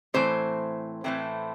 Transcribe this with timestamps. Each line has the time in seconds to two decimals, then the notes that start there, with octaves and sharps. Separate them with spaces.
0.14 A2 E3 A3 C4 C5
1.04 A2 E3 A3 C4